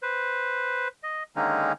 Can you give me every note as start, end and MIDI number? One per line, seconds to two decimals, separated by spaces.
0.03 0.88 71
0.03 0.88 72
1.03 1.23 75
1.36 1.73 50
1.36 1.73 51
1.36 1.73 56
1.36 1.73 58
1.36 1.73 61
1.36 1.73 63